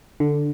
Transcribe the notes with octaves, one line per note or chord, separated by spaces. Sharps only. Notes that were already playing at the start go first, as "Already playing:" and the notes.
D3